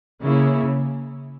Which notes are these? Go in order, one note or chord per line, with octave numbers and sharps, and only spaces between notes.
C#3 A#3 E4 G#4 C#5